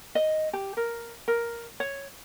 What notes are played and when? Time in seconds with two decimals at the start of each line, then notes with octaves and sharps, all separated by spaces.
0.15 D#5
0.53 G4
0.77 A#4
1.28 A#4
1.80 C#5